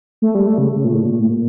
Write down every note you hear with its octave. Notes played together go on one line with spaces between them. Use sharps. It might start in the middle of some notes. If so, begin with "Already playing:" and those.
A3
G3
A3
C#3
C#3
A#2
A2
A#2
A2
A#2